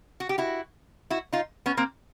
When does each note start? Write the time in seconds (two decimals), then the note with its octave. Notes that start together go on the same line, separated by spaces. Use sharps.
0.20 F#4
0.29 G4
0.38 E4 F#4
1.10 E4 F#4
1.32 D#4 F4
1.66 B3 C#4
1.77 A#3 C4